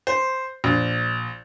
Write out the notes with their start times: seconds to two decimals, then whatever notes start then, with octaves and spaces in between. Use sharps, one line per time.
0.07 C5
0.64 A#1